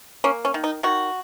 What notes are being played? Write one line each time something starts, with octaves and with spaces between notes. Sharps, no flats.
A#3 C#4
C#4
D#3
D#4
D#3 F#4